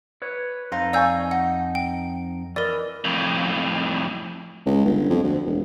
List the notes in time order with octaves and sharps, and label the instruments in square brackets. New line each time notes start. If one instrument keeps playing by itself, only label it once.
[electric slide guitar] B4 C#5
[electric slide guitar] F2 D#4 [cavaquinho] B4 C5 F5
[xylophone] D5 E6 G6 [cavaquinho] F5 G#5 C#6
[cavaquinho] D#5 [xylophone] F#5
[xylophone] G5
[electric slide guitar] E3 [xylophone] A#4 D5 [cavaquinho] D#5
[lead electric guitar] F2 A2
[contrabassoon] C#2
G1
F2
D2
E1